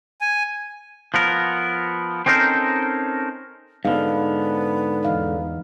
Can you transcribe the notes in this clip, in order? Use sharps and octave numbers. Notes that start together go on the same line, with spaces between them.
G#5
F3 B3 A#4
C4 C#4 D#4 A4 A#4 C5
G#2 D3 B3 F5
E2 D#4 F5